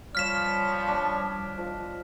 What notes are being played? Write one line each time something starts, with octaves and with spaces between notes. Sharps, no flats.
F3 G3 C#4 C#5 F6 B6 E7
D4
F3 D#5